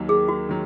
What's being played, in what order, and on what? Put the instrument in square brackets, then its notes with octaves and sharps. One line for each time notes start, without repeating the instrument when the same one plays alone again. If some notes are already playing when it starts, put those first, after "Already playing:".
Already playing: [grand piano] D#2 D#3 F#3 A#3
[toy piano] G#4
F#4
[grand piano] D#3 F#3